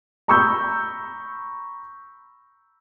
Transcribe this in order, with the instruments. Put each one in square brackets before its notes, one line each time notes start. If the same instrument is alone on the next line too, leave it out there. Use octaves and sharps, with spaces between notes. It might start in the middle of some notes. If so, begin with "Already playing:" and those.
[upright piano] A#5 B5 C#6 D#6 E6 G6